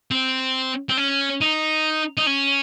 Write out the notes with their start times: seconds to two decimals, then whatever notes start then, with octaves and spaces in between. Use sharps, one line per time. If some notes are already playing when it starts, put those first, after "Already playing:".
0.11 C4
0.89 C4
0.97 C#4
1.41 D#4
2.17 D#4
2.27 C#4